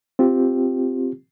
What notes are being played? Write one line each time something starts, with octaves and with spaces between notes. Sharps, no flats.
C4 F4 G4